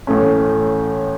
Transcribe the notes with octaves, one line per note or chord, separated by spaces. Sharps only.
A1 A2 A3 C#4